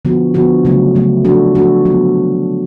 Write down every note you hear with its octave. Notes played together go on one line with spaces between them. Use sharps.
D3 F3 B3 F#4
D3 F3 B3 F#4
C#3 F#3 A3
C#3 F#3 A3
F3 A3 D4 F#4 A4
F3 A3 D4 F#4 A4
D3 F#3 B3